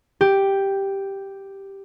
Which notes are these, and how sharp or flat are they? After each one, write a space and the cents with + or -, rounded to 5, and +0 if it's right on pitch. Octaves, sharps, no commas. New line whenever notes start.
G4 +0